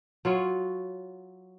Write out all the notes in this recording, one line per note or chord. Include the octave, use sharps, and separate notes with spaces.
F#3 F4 C#5